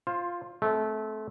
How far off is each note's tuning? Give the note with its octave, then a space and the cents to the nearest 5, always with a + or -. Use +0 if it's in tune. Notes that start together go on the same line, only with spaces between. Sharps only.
F4 +0 C5 +20
A3 -25 C4 +0 A#4 -35